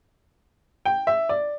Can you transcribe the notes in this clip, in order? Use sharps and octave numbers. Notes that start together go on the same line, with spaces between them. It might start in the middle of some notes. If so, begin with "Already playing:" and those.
G5
E5
D5